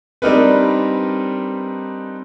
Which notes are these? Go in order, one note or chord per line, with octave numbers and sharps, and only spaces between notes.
G3 C4 D4 D#4 A#4 B4